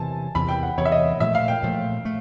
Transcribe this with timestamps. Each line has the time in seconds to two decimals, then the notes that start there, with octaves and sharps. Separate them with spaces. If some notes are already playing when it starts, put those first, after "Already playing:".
Already playing: E2 C3 E3 G#5 A5
0.35 E2 C3 E3 B5
0.49 G5
0.63 F#5
0.78 E2 C3 E3 C#5
0.85 E5
0.92 D#5
1.20 A#2 F3 A3 E5
1.35 F5
1.48 G5
1.63 A#2 F3 A3
2.05 A3